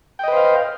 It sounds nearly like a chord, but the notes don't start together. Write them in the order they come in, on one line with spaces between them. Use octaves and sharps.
G5 D#5 B4 C5 F5